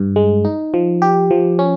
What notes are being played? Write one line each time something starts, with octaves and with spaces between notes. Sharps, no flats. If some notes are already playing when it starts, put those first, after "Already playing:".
Already playing: G2
G#3
D#4
F3
G4
F3
C#4